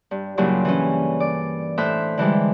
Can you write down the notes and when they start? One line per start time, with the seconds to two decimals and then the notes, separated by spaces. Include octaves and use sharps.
0.11 G2
0.37 G2 A#2 C#3 F#3 A#3 E4
0.65 E3 C#4
1.20 D5
1.78 A2 C5 E5 F#6
2.17 D3 E3 G3 G#3